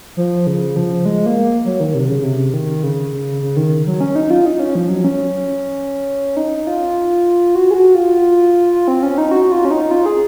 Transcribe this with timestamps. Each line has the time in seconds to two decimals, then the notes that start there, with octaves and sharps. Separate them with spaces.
0.17 F3
0.47 C#3
0.76 F3
1.05 G#3
1.26 A#3
1.65 F#3
1.80 D#3
1.94 C3
2.09 C#3
2.24 C3
2.54 D#3
2.83 C#3
3.13 C#3
3.41 C#3
3.57 D#3
3.86 F#3
4.01 C#4
4.16 D#4
4.30 F4
4.46 D#4
4.60 C#4
4.75 F3
4.89 F#3
5.04 C#4
6.37 D#4
6.67 F4
7.55 F#4
7.71 G#4
7.74 F#4
7.95 F4
8.73 F4
8.88 C4
9.03 C#4
9.18 D#4
9.31 F#4
9.43 F#4
9.52 F4
9.65 C#4
9.71 D#4
9.91 F4
10.06 G#4